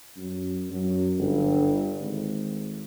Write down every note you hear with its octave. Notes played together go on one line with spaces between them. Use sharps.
F#2
F#2
G1
G#1